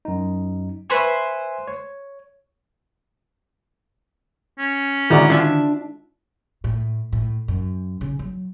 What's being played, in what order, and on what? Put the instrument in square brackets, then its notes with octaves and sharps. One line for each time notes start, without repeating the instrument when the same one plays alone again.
[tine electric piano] F#2 D#4
[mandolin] B4 C5 C#6 [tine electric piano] E5 G#5
[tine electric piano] C#5
[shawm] C#4
[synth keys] D3 D#3 [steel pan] G#3 E4 F#4 [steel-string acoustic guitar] D5 A#5
[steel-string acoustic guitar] D4 E5 A5 [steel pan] F4
[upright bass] A2
A2
F#2
C#3
F#3